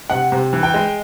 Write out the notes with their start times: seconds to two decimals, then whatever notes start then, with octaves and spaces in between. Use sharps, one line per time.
0.10 C3 F#5
0.32 C3
0.53 E3
0.63 G5
0.74 G#3